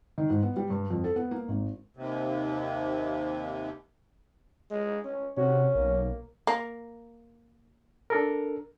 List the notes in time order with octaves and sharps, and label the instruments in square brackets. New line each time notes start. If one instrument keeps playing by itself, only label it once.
[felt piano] D#3
G#2
B3
G3
G2
F2
A4
B3
A#3
G#1
[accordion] D#2 C3
[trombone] G#3
C#4
[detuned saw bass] C3 [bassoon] C#4 [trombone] F#4
[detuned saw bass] B1 [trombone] A#3
[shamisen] A#3
[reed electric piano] D4 A4 A#4